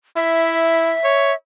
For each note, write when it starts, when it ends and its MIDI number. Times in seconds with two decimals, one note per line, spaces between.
0.16 0.94 64
0.16 1.35 76
1.04 1.32 73